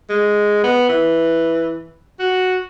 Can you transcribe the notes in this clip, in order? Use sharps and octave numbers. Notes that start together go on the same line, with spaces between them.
G#3
B3
E3
F#4